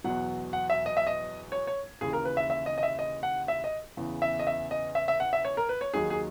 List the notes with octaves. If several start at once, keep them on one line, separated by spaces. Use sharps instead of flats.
E2 B2 F#3 F#5
F#5
E5
D#5
E5
D#5
C#5
C#5
D#2 C#3 E3 G#4
A#4
B4
E5
E5
D#5
D#5
E5
D#5
F#5
E5
D#5
E2 C#3 E3
E5
D#5
E5
D#5
E5
E5
F#5
E5
C#5
A#4
B4
C#5
D#2 D#3 F#3 G#4
G#4